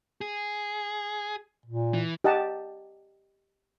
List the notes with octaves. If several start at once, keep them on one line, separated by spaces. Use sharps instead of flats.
G#4
A#2
E3
G4 D#5 F#5 A5